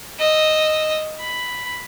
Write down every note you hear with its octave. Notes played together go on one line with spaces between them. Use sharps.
D#5 E6
B5